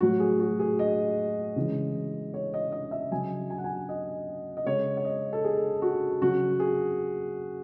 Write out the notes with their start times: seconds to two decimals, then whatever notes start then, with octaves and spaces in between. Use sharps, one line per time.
0.01 A2 F#3 F#4
0.20 G#4
0.40 F#4
0.60 G#4
0.79 D#5
1.56 C#3 E3 G#3
2.34 C#5
2.54 D#5
2.72 D#5
2.91 E5
3.11 C#3 F#3 G#5
3.50 G#5
3.58 F#5
3.64 G#5
3.89 D#5
4.57 D#5
4.66 C#3 G#3 C#5
4.97 C#5
5.05 D#5
5.33 A4
5.44 G#4
5.82 F#4
6.21 C#3 F#3 F#4
6.60 G#4